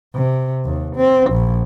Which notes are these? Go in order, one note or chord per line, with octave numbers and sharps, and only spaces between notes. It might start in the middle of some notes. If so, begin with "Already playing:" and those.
C3
D#2
C4
A#1